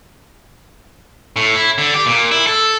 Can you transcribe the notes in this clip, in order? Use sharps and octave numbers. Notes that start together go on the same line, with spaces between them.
A2
E4
D3
G4
A#2
E4
A4